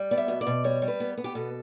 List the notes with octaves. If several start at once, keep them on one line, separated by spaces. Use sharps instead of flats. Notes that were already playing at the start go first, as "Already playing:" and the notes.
Already playing: G3
B3 D5
E5
B2
D5
B2
G3 C#5
G3
B4
B3
B3
G4
B2 A4